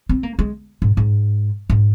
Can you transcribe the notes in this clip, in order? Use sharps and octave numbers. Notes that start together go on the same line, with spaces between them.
C4
A#3
G#3
G#2
G#2
G#2